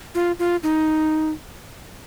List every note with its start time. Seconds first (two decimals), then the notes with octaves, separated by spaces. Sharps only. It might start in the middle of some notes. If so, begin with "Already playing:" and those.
0.15 F4
0.39 F4
0.63 D#4